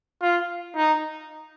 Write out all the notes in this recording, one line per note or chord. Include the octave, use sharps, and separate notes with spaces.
F4
D#4